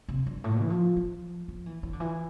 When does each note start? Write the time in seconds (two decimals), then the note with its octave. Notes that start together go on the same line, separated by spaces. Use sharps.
0.08 C3
0.26 G2
0.44 A2
0.61 E3
0.70 F3
0.96 F3
1.48 F3
1.66 E3
1.83 E3
1.93 D3
2.00 E3